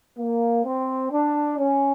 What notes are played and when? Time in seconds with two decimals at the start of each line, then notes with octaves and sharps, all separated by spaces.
0.18 A#3
0.65 C4
1.12 D4
1.58 C#4